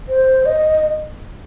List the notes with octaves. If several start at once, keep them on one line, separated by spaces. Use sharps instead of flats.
C5
D#5